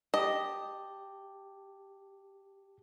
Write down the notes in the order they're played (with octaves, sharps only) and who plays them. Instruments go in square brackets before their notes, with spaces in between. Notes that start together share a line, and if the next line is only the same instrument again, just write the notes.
[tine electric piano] G4 A5 [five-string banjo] D#5